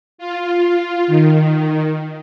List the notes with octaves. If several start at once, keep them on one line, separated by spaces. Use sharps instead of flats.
F4
D#3